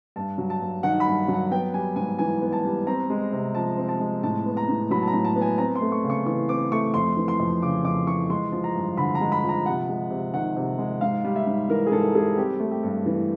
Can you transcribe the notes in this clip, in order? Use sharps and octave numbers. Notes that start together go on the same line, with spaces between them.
G2 A5
F#3
A5
G2
D#3 F#5
B5
G2
F#3
F#5
B3 G5
G3 G#5
G#2 G#5
E3 G#5
B3
A5
G3
C4 A#5
G#3
C3
F3 A5
C4
A5
G#3
A2 A5
B3
A#5
A2
F#3 B5
A5
A#5
A2
A5
B3
G#5
C4 A#5
C6
A3
C#6
C#3
C#6
E3 C#6
C4 D6
A3 C#6
F2 C6
E3
C6
F2
C#3 D6
F2 D6
E3 C#6
G#3 C6
F3
A#5
G2
D3 B5
A#5
G#3
B5
F3
A#5
C3 F#5
G#3
C3
D#3 F#5
C3
G#3
G#2 F5
G3
E5
G#2
E3 A#4
G#4
G#2 A4
G3 G#4
C4 G4
A3
G4
G2
E3